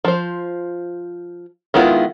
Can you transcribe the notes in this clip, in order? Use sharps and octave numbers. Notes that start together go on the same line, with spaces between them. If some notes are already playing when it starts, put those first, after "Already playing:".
F3 C5
D#3 G#3 B3 E4 F4